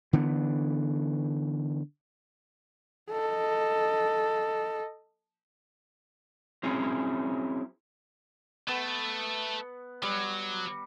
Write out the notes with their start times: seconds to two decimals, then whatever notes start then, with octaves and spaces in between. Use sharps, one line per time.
0.13 D3 E3 B3
3.10 A4 D#5
6.63 F#3 C4 C#4 E4 G#4 C#5
8.68 A3 B3
10.03 F#3 G3